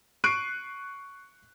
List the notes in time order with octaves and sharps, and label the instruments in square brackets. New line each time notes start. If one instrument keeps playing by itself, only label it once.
[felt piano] C#6 F#6 C7 D7 D#7